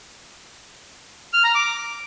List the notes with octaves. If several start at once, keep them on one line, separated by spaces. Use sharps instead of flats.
F6
A#5
D6